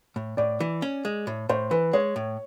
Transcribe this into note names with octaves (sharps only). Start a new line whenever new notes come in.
A2
A2 D5
E3
C#4
G#3
A2
A2 C5
E3 B4
G#3 C#5
A2